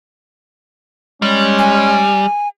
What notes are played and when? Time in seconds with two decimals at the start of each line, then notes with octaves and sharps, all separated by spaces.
1.22 G3 G#3 C#4
1.59 G#5